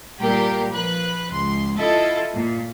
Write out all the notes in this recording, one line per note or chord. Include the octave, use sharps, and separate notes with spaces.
A#2 G3 G4 A#4
F3 B4 F#6
C#2 C6
E4 F4 A4 D#5 E5
A#2